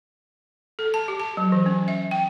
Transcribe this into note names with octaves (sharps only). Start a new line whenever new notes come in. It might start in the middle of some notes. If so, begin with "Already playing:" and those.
A4
A5
G4
A5
F#3
E3
C#4
E5
G5